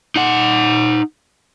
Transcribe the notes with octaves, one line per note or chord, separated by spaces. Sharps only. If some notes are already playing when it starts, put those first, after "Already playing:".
D#4 F#5